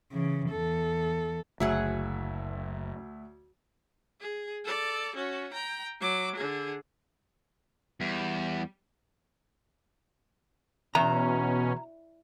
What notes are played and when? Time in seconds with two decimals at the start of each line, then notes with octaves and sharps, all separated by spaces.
0.12 C#3 E3
0.51 E2 A4
1.60 F#1 D2 F#3 G#4 E5 F#5
4.20 G#4
4.65 A4 D5
5.15 C#4 F#4
5.53 G5 A#5
6.00 F#3 D6
6.35 D3 G#4
8.01 E2 G3
10.95 E2 B2 C#4 A#5